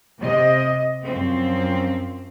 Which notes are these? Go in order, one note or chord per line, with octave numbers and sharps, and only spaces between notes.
C3 D#5
F#2 F3 C4